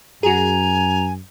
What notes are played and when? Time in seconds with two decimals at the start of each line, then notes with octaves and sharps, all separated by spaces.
0.23 F#2 F#4 G#4 G#5 A#5